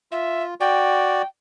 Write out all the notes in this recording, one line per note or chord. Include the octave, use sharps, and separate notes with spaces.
F4 E5
F#4 D5 G5